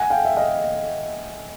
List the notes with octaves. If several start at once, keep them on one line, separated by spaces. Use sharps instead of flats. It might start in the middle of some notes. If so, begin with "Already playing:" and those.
Already playing: F#5 G#5
F5 G5
E5
D#5 F5